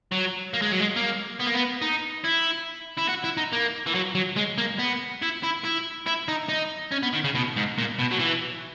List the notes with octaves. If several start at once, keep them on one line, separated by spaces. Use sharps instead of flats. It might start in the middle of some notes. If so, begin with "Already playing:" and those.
F#3
A#3
G#3
F#3
G#3
A#3
B3
A#3
B3
D#4
E4
E4
F#4
E4
D#4
A#3
E3
F#3
F#3
G#3
A#3
B3
E4
E4
E4
E4
D#4
D#4
C#4
B3
D#3
C#3
B2
G#2
A#2
B2
F#3
E3